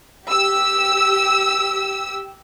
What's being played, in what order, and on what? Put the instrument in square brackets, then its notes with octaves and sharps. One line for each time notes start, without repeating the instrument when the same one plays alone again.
[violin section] G4 E6